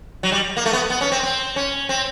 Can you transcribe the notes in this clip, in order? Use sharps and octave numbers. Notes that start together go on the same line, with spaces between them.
F#3
G3
A#3
A3
B3
B3
C#4
C4
C4
C#4
C4